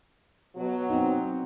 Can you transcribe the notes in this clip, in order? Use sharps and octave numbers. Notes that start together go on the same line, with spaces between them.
B2 F#3
C4 D#4